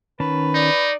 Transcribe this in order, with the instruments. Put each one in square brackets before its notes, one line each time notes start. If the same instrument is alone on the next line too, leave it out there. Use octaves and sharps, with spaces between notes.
[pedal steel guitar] D#3 C#4 A5 [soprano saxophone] B4
[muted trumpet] D#4 [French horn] D5